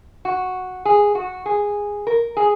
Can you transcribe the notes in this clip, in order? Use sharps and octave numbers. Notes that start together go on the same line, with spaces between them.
F#4
G#4
F#4
G#4
A#4
G#4